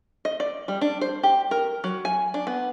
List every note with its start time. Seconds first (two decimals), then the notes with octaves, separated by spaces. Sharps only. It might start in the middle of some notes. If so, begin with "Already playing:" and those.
0.25 D#5
0.40 D5
0.68 G3
0.81 D4
1.01 C5
1.23 G4
1.51 A#4
1.84 F#3
2.05 G#5
2.34 D4
2.47 B3